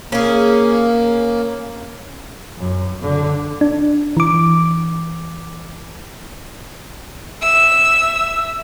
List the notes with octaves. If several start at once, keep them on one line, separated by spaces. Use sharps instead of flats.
A#3 C#4 G#4
F#2
D3
D4
E3 D6
E5 E6